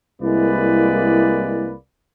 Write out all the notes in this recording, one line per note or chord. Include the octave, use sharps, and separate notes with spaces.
C2 G#3 A#3 E4 B4 D5